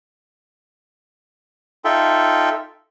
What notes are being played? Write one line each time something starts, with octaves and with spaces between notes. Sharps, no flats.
D#4 F4 A4 E5 G5